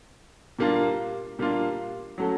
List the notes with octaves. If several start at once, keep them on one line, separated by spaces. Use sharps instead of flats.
A#2 G3 A#3 D4 F4
A#2 G3 A#3 D4 F4
F#3 A3 C#4 F#4 A4